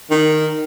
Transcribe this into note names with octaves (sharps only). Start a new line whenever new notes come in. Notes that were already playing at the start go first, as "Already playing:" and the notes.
D#3